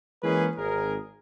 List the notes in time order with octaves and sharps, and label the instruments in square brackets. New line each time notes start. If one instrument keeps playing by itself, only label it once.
[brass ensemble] E3 G#3 A#3 C#4 G#4 B4
G#1 G#4 A#4